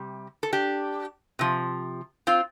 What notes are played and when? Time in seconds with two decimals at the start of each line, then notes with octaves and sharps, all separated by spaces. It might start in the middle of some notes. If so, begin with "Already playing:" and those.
Already playing: C3 G3
0.43 A4
0.53 D4 G4
1.39 C3 F3
2.27 C4 F4